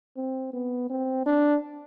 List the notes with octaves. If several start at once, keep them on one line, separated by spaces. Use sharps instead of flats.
C4
B3
C4
D4